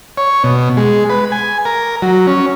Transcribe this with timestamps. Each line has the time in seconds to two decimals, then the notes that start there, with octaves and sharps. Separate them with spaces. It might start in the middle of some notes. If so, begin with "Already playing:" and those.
0.17 C#5
0.44 B2
0.77 G#3
1.10 B4
1.32 G#5
1.65 A#4
2.02 F#3
2.27 C#4